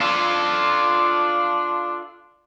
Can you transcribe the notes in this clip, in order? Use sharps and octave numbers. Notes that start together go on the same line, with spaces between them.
D4 F4 A4